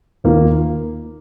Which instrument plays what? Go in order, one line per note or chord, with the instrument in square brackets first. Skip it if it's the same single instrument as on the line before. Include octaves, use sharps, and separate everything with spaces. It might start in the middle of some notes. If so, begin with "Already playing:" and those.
[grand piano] D#2 D#3 A#3 F4